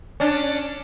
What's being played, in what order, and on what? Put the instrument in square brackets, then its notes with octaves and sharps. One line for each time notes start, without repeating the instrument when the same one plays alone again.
[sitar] C#4 D4